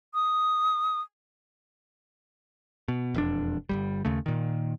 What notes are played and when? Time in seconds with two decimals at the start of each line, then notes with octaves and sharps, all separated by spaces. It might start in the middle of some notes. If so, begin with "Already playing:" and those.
0.14 D#6
2.88 B2
3.14 E1 F2 D4
3.69 G1 D#2 G3
4.05 D#2 C#3 A3
4.26 A#2 D#3